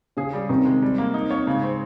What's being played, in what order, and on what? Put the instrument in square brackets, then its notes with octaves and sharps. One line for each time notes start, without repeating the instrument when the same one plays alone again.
[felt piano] C#3 C#4 [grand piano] G#4
[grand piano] G3
[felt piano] C3 C4 [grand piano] D#3
[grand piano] G#3
G3
A#3
D#4
C#5
[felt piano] G#2 G#3 [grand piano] C#3
[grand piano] C4